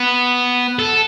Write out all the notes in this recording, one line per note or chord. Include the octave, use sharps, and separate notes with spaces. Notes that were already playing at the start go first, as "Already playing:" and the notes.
Already playing: B3
A4